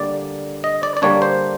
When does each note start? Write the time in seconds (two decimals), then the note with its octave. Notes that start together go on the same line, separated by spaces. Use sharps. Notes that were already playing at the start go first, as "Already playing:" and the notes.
Already playing: D3 G3 A#3 D5
0.64 D#5
0.83 D5
0.97 D5
1.02 D3 G3 A#3 D4 C#5
1.22 C5